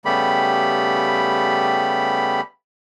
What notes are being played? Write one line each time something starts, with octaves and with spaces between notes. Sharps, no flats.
C#3 G3 A3 B3 G4 B5